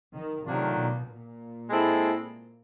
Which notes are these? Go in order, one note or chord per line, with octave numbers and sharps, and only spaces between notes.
D#3
C3 D#3 F#3 A3 D4 F4
B2
A#2
G#3 C4 E4 A4